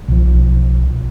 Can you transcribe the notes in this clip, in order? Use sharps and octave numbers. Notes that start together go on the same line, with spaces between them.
B1 F3